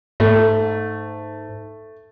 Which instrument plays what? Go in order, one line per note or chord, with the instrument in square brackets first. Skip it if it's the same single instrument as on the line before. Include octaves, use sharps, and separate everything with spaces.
[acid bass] G#2 [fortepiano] A3